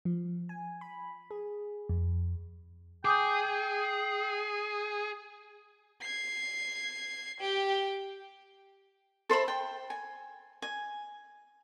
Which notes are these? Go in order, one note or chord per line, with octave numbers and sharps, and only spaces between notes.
F3
G#5
B5
G#4
F2
G#4 G5 D6 D#6 G6
G#6 C7
G4 G5
A4 C5 E5 B5
G5
G#5
G#5